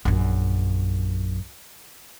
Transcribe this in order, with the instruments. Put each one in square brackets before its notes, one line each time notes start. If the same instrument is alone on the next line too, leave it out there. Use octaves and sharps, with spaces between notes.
[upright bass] A#1 F#2